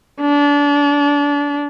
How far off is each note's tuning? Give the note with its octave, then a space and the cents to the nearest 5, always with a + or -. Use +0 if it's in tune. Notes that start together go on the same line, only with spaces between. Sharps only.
D4 -30